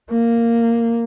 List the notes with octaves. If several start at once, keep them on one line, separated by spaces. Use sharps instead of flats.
A#3